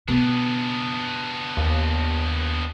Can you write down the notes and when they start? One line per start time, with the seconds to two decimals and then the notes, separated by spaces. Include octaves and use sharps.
0.08 B2 B3 D4
1.57 D#2